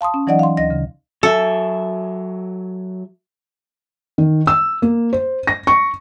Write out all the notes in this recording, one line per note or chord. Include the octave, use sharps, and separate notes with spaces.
F5 A5 C6 D#6
C#4
E3 F#3 D#4 D5 D#5 F#5
F5 C6
D2 D#5 A#6
C#3
F#3 A4 E5
D#3
E6
A#3
C5
A#6
C#6